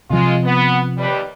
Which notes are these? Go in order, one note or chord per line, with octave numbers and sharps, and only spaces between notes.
C3 F3 G#3 F4
B3
D#2 G3 B4